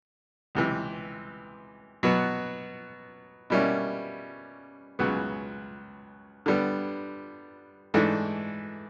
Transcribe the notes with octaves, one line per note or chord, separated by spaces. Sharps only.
C#2 C3 E3
B2 F#3 B3
B2 G3 A#3 C#4 E4
C#2 C#3 F#3 B3
D3 G3 B3
G#2 E3 A3 D4